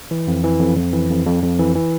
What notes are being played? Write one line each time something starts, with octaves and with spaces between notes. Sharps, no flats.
E3
F2
E3
F2
F2
E3
F2
F2
F2
E3
E3